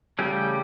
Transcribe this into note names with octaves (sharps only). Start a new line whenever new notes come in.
C#3 E3 G3 A3 C#4 G4